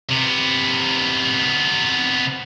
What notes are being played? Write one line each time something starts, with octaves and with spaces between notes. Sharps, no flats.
C3 B3